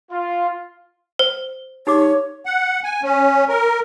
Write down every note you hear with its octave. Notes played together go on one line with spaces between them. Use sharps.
F4
C5
D#4 G4 C#5 D6
F#5
G#5
C#4
A#4